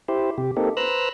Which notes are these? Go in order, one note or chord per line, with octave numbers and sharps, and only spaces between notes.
E4 G4 C5
C3 G4
A#3 C4 D#4 G4 A4
B4 C5 A#5 E6 F#6